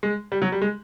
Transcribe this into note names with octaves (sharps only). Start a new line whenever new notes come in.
G#3
G3
F#3
G3
G#3